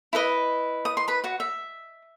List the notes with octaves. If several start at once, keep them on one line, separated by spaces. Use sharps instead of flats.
E4 B4 D#5
D#6
C6
B4 B5
F#4 F#5
E5